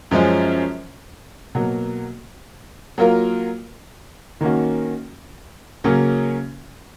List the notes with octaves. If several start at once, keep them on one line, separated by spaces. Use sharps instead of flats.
F#2 F3 G#3 C#4
B2 F#3 A#3
F#3 A#3 F4 A#4
D#3 A#3 C#4 F#4
C#3 F#3 A#3 C#4